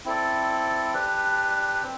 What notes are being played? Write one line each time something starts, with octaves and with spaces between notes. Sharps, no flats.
C4 E4 A4 D5
D4 G4 B4
C4